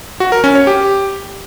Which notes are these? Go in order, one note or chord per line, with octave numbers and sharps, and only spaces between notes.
F#4
A#4
C#4
C#5
G4